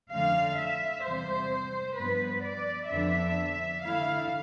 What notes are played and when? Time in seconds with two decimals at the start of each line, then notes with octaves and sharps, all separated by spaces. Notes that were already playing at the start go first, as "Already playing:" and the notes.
0.11 F2 D3 A3 F5
0.58 E5
1.04 E2 C3 G3 C5
1.97 G2 F3 B3 B4
2.45 D5
2.91 F2 D3 F3 B3 D4 E5
3.84 D3 A3 E4 F5